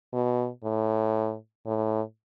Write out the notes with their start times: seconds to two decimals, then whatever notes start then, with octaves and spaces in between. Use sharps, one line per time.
0.13 B2
0.64 A2
1.66 A2